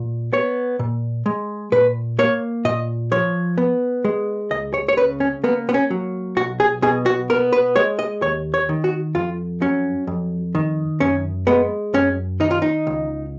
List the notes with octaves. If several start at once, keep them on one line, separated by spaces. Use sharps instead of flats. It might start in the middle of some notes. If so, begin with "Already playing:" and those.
Already playing: A#2
B3 C#5
A#2
G#3
A#2 B4
A#3 C#5
A#2 D#5
F3 C#5
B3
G#3
C#2 D#5
C#5
C#5
C#3 B4
C#4
A#3 B3
B3
C#4
F#3
B1 F#4
G#4
B2 G#4
F#4
B3 A#4
B4
G#3 C#5
D#5
D#2 C#5
C#5
D#3
F#4
F2 F4
F#3 C#4
F2
D#3
F#2 C#4
G#3 B3
F#2 C#4
D#3 D#4
F4
D#4
C#2